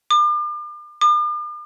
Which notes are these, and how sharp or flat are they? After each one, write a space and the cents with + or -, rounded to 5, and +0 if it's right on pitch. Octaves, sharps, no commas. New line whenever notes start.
D6 +40
D6 +45